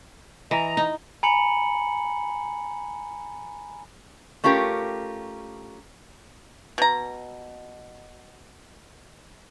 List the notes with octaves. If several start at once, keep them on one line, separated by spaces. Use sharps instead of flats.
E3 D#5 A#5
D#4
G#5 A#5 B5 C#7 F#7
A3 C#4 F4 G4 A#4
B2 A#5